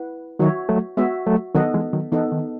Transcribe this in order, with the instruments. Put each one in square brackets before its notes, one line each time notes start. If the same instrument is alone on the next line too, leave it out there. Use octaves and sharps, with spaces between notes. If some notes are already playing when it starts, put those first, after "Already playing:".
Already playing: [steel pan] E4 B4 F#5
[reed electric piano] D#3 F#3 [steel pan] F#4 C#5 E5
[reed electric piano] F#3 A3
[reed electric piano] G#3 B3 [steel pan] F#4 C#5 E5
[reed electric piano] F#3 A3
[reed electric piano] D#3 F#3 [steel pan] B3 D#4 A4 D#5 F#5
[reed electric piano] E3 G#3
D#3 F#3
[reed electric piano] E3 [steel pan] B3 D#4 A4 D#5 F#5
[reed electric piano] D#3